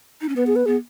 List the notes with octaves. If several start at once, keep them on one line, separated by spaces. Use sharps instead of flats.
D#4
C#4
B3 B4
G#4
B4
B3 G#4